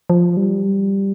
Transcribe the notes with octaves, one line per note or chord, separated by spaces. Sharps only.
F3
G3